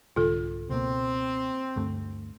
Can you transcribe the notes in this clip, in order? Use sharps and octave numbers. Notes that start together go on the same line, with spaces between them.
C2 G#2 D3 F4 A4
C#2 B2 A#3 C4
D2 G2 A3